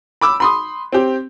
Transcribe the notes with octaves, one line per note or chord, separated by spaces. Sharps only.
B5 D6 E6
B5 C6 D#6
C4 G4